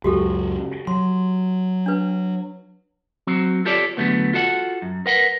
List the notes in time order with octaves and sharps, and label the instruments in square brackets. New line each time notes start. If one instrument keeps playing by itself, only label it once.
[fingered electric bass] C#2 F#2 C#3 [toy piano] F#4 G4 A4
[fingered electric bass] F#3 [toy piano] C6
[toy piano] D4 B4
[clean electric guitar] F#3 C4 F#4
F4 G4 A4 C#5 D5
E2 A#2 D3 F#3 A3 B3
F4 F#4 A4 D#5 F#5
F#2
A#4 B4 F#5